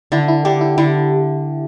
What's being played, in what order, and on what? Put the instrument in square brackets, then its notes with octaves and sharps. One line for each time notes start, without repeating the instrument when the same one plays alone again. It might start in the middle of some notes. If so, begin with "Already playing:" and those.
[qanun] D3 [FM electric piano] E4
[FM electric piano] E4
[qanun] D3 [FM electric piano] G4
[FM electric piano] E4
[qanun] D3 [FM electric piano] E4